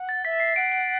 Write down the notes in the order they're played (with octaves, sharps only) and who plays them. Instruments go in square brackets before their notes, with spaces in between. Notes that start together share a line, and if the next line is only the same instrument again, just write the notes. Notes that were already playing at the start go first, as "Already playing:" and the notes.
Already playing: [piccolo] F#5
[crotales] A6
[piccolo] E5 [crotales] B6
[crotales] C7
[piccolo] F#5 [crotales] D7
[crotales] D7